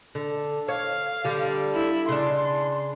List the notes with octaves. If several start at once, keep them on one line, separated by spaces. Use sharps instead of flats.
D3
C#5 F5
D3 G3
E4
C#3 D4 C6